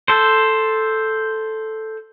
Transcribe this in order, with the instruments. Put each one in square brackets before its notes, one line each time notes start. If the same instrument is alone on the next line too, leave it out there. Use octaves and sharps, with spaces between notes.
[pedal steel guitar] A4 C5